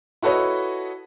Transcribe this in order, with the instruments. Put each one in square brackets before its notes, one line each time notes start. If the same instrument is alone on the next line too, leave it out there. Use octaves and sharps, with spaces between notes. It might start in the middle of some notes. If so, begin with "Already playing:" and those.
[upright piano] E4 F#4 A4 B4 C#5 D#5